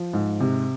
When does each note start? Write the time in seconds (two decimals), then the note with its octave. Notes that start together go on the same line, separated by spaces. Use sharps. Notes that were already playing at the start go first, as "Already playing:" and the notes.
Already playing: F3
0.13 G#2
0.40 C3